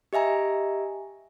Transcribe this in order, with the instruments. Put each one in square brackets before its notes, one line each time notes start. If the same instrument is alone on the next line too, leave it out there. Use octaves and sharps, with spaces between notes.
[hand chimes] G4 D#5 E5 G#5 A#5